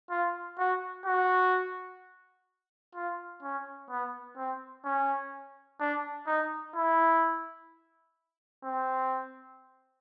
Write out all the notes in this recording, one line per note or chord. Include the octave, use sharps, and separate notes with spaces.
F4
F#4
F#4
F4
C#4
B3
C4
C#4
D4
D#4
E4
C4